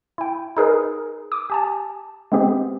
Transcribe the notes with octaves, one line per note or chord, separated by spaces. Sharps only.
E4 G5
D#4 G#4 A#4 B4
D6 D#6
G4 G#5 A5
G#3 B3 C4 G4 G#4